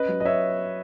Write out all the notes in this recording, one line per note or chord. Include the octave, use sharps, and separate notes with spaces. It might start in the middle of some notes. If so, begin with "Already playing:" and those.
Already playing: C#4 B4 D#5
F#3
D#5
C#5 E5